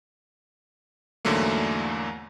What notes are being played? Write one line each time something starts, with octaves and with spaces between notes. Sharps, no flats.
E2 G#2 D3 F#3 A3 A#3